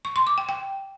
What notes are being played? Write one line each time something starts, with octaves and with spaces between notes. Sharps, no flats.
C#6
C6
D6
G5
G5